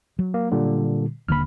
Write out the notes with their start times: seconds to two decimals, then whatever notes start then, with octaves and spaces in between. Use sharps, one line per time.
0.19 F#3
0.34 A#3
0.51 A#2 D3 G3
1.29 D#1 D3 A#3 B5 F6